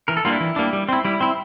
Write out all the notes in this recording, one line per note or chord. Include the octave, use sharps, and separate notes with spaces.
E3 A#4
A4
G3 A#3 D4 F4
E4
E3
G3 A#3 D4
G3
C4 E4
G3 E4
C4 E4